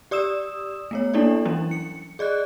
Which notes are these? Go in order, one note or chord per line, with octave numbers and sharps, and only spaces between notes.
G4 D5 D#6 E6 E7
A3 B3 C#5
A#3 D4 E4 A4 D5
E3 F#3 G3 C#4 D4 E4
C#7
G#4 D5 D#5 F#6